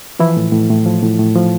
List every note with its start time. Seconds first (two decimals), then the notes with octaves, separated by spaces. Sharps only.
0.19 E3 F3 E4
0.37 A2
0.52 A2
0.70 A2
0.86 F3
1.03 A2
1.19 A2
1.36 F3